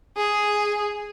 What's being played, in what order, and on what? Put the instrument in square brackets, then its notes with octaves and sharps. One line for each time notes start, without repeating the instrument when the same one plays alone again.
[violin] G#4